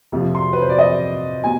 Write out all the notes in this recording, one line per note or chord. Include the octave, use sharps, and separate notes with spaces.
F2 C3 F3
C6
B4
C5
D5
D#5
B2 G3 G#5